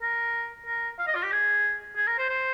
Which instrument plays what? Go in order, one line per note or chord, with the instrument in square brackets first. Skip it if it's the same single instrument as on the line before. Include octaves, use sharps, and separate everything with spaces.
[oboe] A#4
A#4
F5
D#5
F4
G4
G#4
G#4
A#4
C5
C5